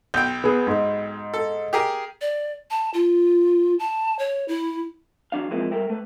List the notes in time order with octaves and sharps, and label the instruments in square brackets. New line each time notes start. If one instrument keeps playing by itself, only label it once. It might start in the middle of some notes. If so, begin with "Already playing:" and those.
[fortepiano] B1 G5 [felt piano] G6
[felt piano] B3 G#4
G#2
[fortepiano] A4
G4 G#4 A#4
[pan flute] D5
A5
F4
A5
C#5
E4
[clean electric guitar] E3 F#3 D4 F5
E3 F3 G#3 A#3 C4 E4
G3 A4 A#4 E5 G5
A3 B4